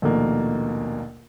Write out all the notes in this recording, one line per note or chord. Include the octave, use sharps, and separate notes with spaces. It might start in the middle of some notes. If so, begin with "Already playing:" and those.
A#1 D#2 B2 A3 A#3